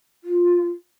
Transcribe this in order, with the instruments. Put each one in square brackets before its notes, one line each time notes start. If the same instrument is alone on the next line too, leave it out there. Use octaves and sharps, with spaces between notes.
[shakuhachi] F4